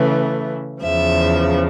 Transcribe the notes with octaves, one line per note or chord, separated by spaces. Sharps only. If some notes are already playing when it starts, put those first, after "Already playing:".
Already playing: C#3 E3 A3
E2 C#3 F3 E5